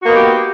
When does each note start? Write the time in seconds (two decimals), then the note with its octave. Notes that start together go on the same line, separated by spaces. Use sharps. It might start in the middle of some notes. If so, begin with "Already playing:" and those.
0.01 F#4
0.04 A#3
0.08 B3
0.11 D#4
0.15 G4